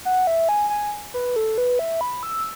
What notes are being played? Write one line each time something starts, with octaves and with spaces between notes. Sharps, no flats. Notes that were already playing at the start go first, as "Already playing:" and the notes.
F#5
E5
G#5
G#5
B4
A4
B4
E5
B5
E6